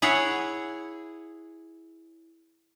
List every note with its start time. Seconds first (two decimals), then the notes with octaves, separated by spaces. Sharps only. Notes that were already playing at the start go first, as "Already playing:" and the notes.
0.02 E4 G#4 C#5 F#5